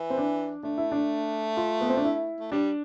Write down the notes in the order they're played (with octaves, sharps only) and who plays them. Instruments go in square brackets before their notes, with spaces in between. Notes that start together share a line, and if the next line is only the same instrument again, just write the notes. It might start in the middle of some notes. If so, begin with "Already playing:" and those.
Already playing: [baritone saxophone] E3
[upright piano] C4
D4
[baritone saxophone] A3 [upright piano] D4
[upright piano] E4
D4
F4
B3
C4
D4
E4
[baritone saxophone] A3
[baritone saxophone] G3 [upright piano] D4